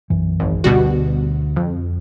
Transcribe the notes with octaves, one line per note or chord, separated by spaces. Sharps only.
B1 F#2 E3
G#1
D2 B2 G3 F#4
F2